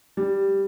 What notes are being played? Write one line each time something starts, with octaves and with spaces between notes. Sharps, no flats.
G3